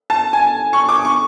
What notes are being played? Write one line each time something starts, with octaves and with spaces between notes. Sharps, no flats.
A5
G#5
C#6
D6
C#6